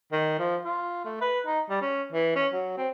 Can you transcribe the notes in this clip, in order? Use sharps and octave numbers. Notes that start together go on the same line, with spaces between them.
D#3
F3
F4
A3
B4
D#4
G3
C#4
E3
C#4
F#3
C4